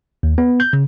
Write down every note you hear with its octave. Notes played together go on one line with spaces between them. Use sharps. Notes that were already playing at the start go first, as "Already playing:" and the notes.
D#2
B3
G6
C#3